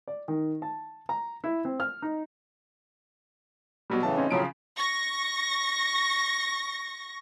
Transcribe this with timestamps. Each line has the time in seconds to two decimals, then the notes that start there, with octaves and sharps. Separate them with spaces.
0.08 D5
0.28 D#3
0.62 A5
1.09 A#5
1.44 E4
1.65 C4
1.80 F6
2.02 D#4
3.90 B2 F#3 G3
4.03 A2 C#3 E3 A5
4.17 C4 C#4 D#4
4.30 A2 C#3 F3 F#3 D7
4.77 C#6 A#6